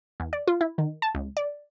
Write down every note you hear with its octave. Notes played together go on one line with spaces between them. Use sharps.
E2
D5
F4
E4
D#3
A5
C#2
D5